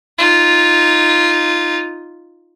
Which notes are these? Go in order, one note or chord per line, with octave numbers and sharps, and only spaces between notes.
D#4 F4